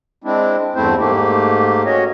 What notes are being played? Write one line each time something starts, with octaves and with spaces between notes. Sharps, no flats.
G#3 C4 D4 E4
E2 G2 A3 C4 E4 C5
G#2 A3 A#3 G4
C#4 F#4 C#5 D#5